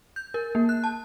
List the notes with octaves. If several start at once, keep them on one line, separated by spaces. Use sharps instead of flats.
G6
A#4
A#3
F#6
A5